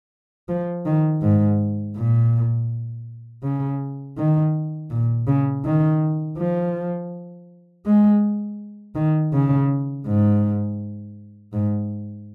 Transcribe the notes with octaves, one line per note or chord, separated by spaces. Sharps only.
F3
D#3
G#2
A#2
C#3
D#3
A#2
C#3
D#3
F3
G#3
D#3
C#3
G#2
G#2